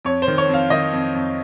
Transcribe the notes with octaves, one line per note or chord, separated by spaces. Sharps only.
F2 C#5
C5
D#3
C#5
F2 F5
D#3 D#5
F2
F2